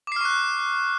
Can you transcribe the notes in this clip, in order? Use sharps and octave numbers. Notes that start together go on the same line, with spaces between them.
C#6 D6 F6 F#6 C7